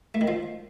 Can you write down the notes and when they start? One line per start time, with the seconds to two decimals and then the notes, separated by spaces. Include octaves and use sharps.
0.15 A3
0.21 D#3
0.28 F3